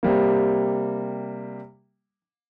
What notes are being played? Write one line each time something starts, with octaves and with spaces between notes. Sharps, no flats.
C3 G3 A#3